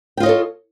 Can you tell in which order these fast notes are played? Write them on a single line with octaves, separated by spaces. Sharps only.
G5 F4 D#5 C#5 A4